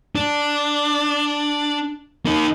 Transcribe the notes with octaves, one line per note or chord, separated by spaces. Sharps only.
D4
A#3 D#4